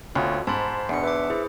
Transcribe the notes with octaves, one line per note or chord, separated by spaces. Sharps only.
D2 B2 C4 F4 C#5
G#2 C5 A5 B5
E2 B2 B3 D4 C#7
B4 E5 D6
E4 G#4 C5